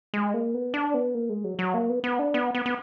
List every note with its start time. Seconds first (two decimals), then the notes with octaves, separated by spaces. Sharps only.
0.14 G#3
0.34 A#3
0.54 B3
0.74 D4
0.94 B3
1.15 A#3
1.29 G#3
1.44 F#3
1.59 F#3
1.74 A#3
1.89 B3
2.04 B3
2.19 D4
2.34 B3
2.55 B3
2.66 B3